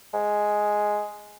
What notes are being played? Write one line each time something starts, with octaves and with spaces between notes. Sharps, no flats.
G#3